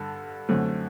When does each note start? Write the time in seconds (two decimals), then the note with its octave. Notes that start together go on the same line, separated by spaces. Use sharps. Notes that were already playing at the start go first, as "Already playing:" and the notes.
Already playing: G2 D3 A4
0.49 F#2 D3 A3 C4